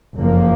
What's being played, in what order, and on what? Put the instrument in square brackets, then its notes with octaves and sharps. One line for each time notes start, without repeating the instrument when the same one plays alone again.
[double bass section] F#1 F2 F3 A#3